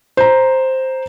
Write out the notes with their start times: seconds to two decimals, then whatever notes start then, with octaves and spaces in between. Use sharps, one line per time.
0.17 C5 A#5